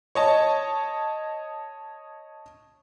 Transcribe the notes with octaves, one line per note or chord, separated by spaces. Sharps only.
C#5 D#5 A5